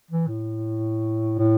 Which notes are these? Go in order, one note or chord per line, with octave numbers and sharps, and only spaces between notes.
E3
A2
A2